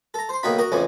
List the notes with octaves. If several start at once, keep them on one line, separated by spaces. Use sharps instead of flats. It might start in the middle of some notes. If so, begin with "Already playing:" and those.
A4 A#5
C5 C6
B1 D#3 A#3 D#4 F#4 B5
F#4 A#4 D#5
A1 F2 C#3 E3 G#5